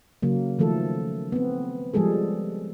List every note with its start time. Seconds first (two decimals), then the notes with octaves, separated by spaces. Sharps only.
0.23 C#3 F#3 A#3
0.59 D#3 F3 A3 A4
1.32 B3 C4
1.94 F3 G3 G#3 G#4 A4